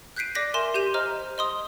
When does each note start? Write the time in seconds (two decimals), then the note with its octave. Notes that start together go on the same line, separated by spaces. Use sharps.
0.17 F#6 G6 B6 C7 D7 D#7
0.35 D5 D6 A#6 B6
0.54 A#4 E5 G#5 C6 E7
0.74 G4 G6 D#7 F7
0.94 C5 D#5 A#5 F6
1.38 D#5 C6 D#6